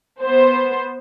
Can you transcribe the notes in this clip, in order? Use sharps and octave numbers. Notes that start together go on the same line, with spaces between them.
B3 C5